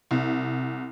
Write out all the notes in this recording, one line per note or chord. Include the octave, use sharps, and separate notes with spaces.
C2